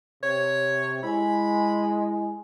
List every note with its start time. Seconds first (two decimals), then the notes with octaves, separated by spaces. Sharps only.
0.23 C3 C#5
1.03 G#3 E4 G#5 B5